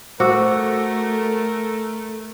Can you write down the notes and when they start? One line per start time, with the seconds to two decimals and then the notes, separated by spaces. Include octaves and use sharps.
0.20 A3 F#4 A4 A#4 C5 D6 E6